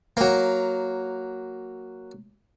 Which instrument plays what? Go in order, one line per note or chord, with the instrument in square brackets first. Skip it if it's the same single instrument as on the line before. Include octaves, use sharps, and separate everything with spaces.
[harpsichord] F#3 A#3